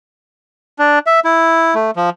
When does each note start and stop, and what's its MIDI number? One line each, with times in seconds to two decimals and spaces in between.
0.79 0.99 62
1.06 1.20 76
1.25 1.74 64
1.75 1.91 57
1.96 2.10 53